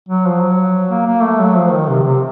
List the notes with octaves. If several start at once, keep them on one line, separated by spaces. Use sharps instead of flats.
F#3
F3
F#3
A#3
A#3
A3
F#3
F3
D#3
C3
C3